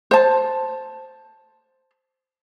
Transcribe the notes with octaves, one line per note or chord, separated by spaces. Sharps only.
C5 A5